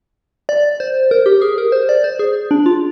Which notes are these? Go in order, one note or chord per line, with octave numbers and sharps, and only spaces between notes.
D5
C5
A#4
G4
G#4
A#4
C5
D5
C5
G#4
D4
F4